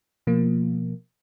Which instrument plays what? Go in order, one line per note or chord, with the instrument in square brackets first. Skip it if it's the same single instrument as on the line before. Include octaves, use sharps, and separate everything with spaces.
[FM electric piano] B2 F3 A#3